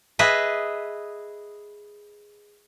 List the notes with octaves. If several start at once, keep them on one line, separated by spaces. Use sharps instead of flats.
G#4 B4 D#5 E5